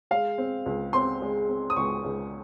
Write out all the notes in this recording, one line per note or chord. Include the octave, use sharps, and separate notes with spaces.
G#3 F5
C4
C#2
C4 C6
G#3
C4
D#6
C#2 C#6
C#2